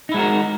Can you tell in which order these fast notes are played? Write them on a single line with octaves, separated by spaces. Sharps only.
D#4 E4 G#3 F#4 A#4